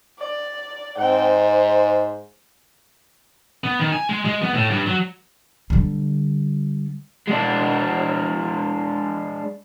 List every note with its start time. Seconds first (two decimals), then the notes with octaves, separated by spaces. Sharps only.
0.19 D5
0.98 G#2 C4 G5
1.33 C5
3.64 B3
3.80 D#3
3.92 G#5
4.09 G#3
4.25 G#3
4.42 B3
4.54 A2
4.70 G2
4.87 F#3
5.70 D3 G3
7.28 G#3 D4